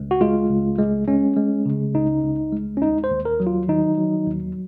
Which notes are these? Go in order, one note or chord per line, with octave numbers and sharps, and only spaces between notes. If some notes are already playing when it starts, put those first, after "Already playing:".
Already playing: C#2
F#4
G#3 F4
C#2
G#3
G#3 C#4
G#3
C#3
C#2 D#4
C#2
G#3
C#4
D#2 D#4
C5
D#2
A#4
F#3
F4
D#3 D#4
F#3
D#2